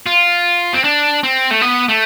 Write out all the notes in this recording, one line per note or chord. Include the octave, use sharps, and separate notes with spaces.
F4
C4
D4
C4
A3
B3
A3